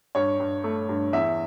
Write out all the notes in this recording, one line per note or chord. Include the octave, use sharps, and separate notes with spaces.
G2 C#5
G2
A3
G2
E2 E5